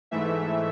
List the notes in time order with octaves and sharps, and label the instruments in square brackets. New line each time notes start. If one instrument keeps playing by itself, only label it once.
[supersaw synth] G#2 E3 A3 E5